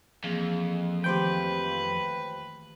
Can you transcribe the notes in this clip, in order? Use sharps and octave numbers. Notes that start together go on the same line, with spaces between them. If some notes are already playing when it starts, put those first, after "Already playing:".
F2 E3 A#3 G#4
D#3 A3 G4 B4 C5 G5